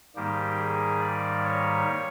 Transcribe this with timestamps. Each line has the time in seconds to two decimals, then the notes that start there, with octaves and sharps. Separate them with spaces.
0.16 G#2 D#3 G3 A#3 G4
0.59 G#4
1.01 D5
1.44 C#5